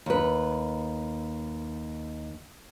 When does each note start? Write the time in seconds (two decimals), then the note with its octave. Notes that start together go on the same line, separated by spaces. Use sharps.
0.06 D#2 B4